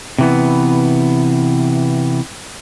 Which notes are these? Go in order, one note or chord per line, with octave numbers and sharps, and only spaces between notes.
C3 E3 B3